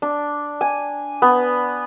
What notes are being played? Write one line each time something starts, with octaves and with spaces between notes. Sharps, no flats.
D4
G#5
B3